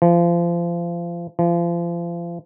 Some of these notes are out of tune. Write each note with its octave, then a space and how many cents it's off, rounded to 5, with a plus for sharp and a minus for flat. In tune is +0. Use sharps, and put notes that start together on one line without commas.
F3 -30
F3 -35